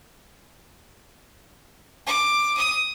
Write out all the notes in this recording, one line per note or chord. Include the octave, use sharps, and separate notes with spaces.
D6
D#6